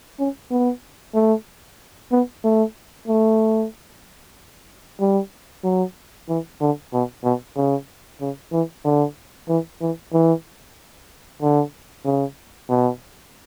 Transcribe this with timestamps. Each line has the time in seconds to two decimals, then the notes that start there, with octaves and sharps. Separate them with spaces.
0.19 C#4
0.51 B3
1.15 A3
2.12 B3
2.44 A3
3.08 A3
5.00 G3
5.64 F#3
6.28 E3
6.61 D3
6.93 B2
7.24 B2
7.56 C#3
8.21 C#3
8.52 E3
8.85 D3
9.48 E3
9.81 E3
10.13 E3
11.42 D3
12.05 C#3
12.70 B2